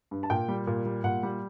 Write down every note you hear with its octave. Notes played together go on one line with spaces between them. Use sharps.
G2
A5
A#2 G5
G3
A#2
G3
A#2 F#5
G3